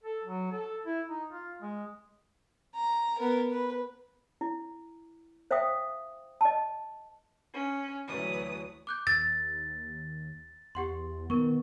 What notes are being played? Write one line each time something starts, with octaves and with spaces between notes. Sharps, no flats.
A4
F#3
A4
E4
D#4
F4
G#3
A#5
B3 A#4
B4
E4
C5 E5 F5 G5 D#6
D#5 A5
C#4
D2 E3 F#3 B4 D#6
D6 F#6 G6
D#2 E6 A6
E2 G4 F#5 C6
D#3 B3 A#4 C#6